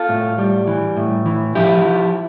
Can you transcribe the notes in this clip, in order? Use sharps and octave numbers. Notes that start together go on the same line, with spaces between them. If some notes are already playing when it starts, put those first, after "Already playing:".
Already playing: F4 A4
A2
G3
E3
A2
E3
F3 E4 G4
F3